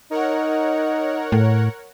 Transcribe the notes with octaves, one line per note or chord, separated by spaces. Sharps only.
D#4 A#4 C#5 F#5
A2